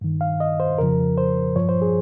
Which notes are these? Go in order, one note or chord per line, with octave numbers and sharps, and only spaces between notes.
G2 D#3
F5
D#5
C5
F2 C#3 F3 A#4
C5
G2 F3 C#5
C5
G#4